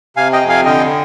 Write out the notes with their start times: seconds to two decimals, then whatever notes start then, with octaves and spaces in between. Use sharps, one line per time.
0.17 C3 F5 G#5
0.33 D#5 G5
0.41 F2
0.49 F5 G#5
0.65 D3 D#5 G5